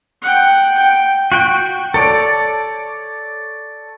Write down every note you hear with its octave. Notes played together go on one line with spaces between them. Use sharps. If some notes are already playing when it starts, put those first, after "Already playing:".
F#5 G5
G5
F#4 G5
A4 C#5 D5